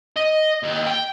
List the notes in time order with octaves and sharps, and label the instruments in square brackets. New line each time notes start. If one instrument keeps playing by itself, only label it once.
[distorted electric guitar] D#5
D#2
G5